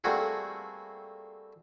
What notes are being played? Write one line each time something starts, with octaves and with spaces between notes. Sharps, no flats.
G3 A3 A#3 C4 F#4 G#4